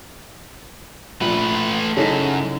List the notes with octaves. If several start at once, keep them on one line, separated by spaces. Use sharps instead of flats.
A#1 A3 B4
F#2 C#3 D#4 E4 A4